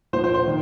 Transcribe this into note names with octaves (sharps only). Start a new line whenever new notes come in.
A#2 F3 C5
C5
C5
D#3